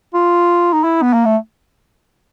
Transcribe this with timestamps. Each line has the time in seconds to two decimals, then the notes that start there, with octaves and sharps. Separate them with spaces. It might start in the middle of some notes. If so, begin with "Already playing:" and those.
0.14 F4
0.73 D#4
0.84 E4
1.02 B3
1.13 A#3
1.25 A3